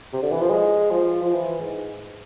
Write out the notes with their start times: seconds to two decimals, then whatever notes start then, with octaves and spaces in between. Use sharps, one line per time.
0.13 C3
0.22 D3
0.31 E3
0.41 F3
0.50 G#3
0.91 F3
1.23 F3
1.33 E3
1.61 G#2